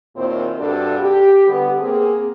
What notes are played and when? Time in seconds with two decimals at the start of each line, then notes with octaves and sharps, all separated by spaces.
0.16 D#2 A#2 C4 E4 C5
0.59 G2 C3 D4 F#4 A4
0.99 G4
1.47 D3 G3 B3
1.80 A#3 C4 G#4